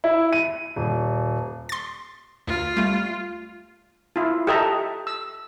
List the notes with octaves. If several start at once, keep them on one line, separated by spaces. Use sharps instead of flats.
E4
D#7
D#1
C6 A6
D2 F4
G3 A3
E4 F4
G4 A4 D#5 E5 A5 A#5
E6